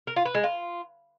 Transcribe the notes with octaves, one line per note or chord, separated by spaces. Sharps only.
A#4
F4
B4
G#3
F4